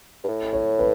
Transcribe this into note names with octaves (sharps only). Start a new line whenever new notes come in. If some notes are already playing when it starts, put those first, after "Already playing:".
G2
A2
C#5
B4